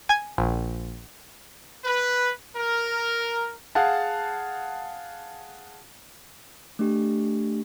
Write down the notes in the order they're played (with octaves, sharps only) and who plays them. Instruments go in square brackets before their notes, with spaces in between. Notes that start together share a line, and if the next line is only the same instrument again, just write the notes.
[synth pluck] G#5 G#6
A#1
[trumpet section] B4
A#4
[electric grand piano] G#4 F5 F#5 A5
[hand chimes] A3 D4 G4